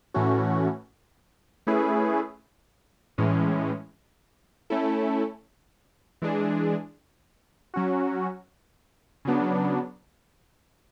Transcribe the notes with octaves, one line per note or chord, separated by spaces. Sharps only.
A2 E3 A3 C#4 F#4
A3 C#4 E4 G#4 B4
A2 E3 G#3 C#4
A3 C#4 E4 A4
E3 G#3 D4 G#4
F#3 C#4 F#4
C#3 F#3 B3 D4